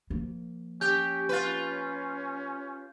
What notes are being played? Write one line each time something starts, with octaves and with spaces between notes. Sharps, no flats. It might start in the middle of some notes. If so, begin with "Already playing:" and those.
F3 A#3
C#4 G4 G6
F4 B4